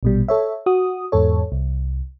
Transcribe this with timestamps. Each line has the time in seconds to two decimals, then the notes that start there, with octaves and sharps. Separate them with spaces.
0.03 A#1 B2 G3
0.28 A4 C#5 E5
0.66 F#4 D#6
1.12 E2 G#2 A4 C#5
1.52 C2